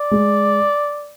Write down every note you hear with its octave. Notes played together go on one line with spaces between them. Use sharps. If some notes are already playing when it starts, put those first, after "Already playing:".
Already playing: D5
G#3